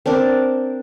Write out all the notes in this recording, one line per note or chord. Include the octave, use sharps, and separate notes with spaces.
C4 D4 A#4 D5